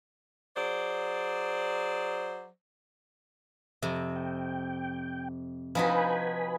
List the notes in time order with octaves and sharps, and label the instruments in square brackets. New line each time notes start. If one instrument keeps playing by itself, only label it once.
[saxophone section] F#3 G#4 C5 D5
[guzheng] F2 C3
[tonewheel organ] G5
[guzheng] F3 D#4 F#4 [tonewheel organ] B4 G#5 B5